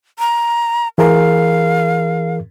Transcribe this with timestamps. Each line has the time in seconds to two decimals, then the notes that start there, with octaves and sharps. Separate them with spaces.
0.19 A#5
0.98 E3 G#4 A#4 F5